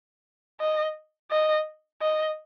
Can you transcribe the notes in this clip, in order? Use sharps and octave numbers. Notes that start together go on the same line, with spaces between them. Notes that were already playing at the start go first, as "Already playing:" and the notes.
D#5
D#5
D#5